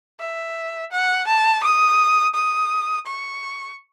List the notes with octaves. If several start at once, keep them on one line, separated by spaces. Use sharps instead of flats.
E5
F#5
A5
D#6
D#6
C#6